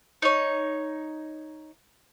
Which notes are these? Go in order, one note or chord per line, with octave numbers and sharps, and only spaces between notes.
D#4 C#5